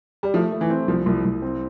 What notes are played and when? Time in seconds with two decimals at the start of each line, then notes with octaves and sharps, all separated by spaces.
0.23 G3
0.34 F3 A3
0.52 A3
0.61 E3
0.70 C4
0.88 C2 F3
1.06 C2
1.25 C2
1.42 C4